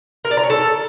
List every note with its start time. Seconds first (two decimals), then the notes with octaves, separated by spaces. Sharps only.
0.25 A#4
0.31 D5
0.37 A#5
0.44 C#5
0.50 A4